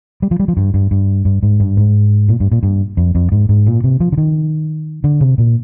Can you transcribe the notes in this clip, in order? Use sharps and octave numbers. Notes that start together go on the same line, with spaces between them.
G3
F3
G3
F3
G2
G2
G2
G2
G#2
G2
G#2
A#2
G2
A#2
G2
F2
F2
G#2
G#2
A#2
C3
F3
D3
D#3
D3
C3
A#2